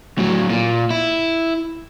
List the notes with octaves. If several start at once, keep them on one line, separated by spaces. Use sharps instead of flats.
A2 F#3
A#2
E4